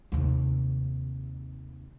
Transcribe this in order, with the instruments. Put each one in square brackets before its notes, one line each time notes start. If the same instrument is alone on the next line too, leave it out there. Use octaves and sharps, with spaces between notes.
[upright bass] D#2 C3